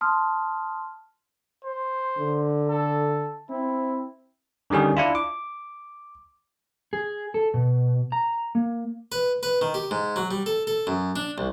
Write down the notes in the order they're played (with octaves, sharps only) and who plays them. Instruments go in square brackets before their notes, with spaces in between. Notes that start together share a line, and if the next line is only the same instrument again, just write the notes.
[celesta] A5 C6 D#6 F6
[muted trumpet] C5
[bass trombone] D3
[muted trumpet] A4
[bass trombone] C4 [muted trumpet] E4
[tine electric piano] D3 D#3 G3 C#4 G#4
D4 E4 F4
D6
[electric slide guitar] G#4
A4
B2
A#5
A#3
[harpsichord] B4
B4
D#3
G4
G#2
F#3
G3
A4
A4
F#2
D4
C2